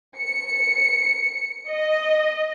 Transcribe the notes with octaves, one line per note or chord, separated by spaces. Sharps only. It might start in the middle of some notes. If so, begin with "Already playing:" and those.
C#7
D#5